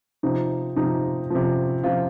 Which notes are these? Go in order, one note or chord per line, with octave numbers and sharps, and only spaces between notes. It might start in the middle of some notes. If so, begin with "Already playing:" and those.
C3 F3 D#4
C3 F3 D#4
C3 F3
C3 F3 F4